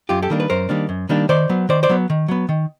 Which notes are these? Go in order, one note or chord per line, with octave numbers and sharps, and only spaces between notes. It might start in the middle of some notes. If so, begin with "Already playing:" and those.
F#2 F4 G4
G4 A4
D#3 G3 A#3 D4
B4
F#2 A#4 C5
D#3 G3 A#3 D4
F#2
D#3 G3 A#3 D4
D#3 C5 D5
F#3 B3
D#3 C5 D5
C5 D5
F#3 B3
D#3
F#3 B3
D#3